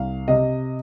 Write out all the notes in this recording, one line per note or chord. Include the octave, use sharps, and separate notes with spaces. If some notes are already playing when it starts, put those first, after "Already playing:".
Already playing: C2 F5
C3 D#5